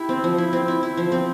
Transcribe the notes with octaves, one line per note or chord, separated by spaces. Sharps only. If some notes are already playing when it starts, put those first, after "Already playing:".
Already playing: E4 G4
C4
F3
E4
C4
E4
E4
F3
C4